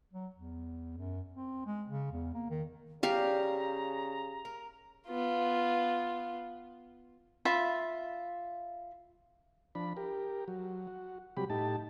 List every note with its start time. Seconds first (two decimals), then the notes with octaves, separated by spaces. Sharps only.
0.14 F#3
0.36 E2
0.97 F#2
1.34 C4
1.66 G#3
1.88 C#3
2.12 E2
2.34 A#3
2.50 D#3
3.03 C#3 G3 G4 F5 A#5
4.45 A#4
5.08 B3 F4
7.45 F4 E5 B5
9.75 F3 D4 B5
9.97 G4 A#4
10.48 F#3
10.87 F#4
11.37 C3 F#3 G3 G4 B5
11.50 A2 D#4 G4 A5